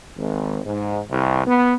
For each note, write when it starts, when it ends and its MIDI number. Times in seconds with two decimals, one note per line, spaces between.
0.17 0.59 32
0.65 1.00 44
1.10 1.42 36
1.47 1.73 59